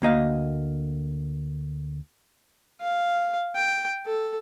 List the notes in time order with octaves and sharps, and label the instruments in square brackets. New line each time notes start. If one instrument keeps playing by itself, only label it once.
[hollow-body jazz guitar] D2 A#3 D#5 F5
[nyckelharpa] F5
G5
A4